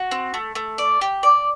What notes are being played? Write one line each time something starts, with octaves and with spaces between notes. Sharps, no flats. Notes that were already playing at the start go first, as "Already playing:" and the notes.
Already playing: F#4
C4
A3
A3
D5
G4
D5